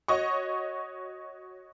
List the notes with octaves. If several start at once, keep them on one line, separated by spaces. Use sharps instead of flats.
F#4 C#5 D#5 C#6